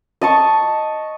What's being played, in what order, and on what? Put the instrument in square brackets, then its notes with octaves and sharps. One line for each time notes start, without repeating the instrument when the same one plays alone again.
[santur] D#5 A5 C#6